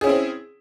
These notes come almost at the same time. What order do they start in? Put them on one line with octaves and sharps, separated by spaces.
G#4 C#4 E4 C4